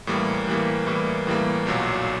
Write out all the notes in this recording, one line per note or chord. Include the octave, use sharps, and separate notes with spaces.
A2 E3 G3 A#3
A2 E3 G3 A#3
A2 E3 G3 A#3
A2 E3 G3 A#3
B1 A#2 F#3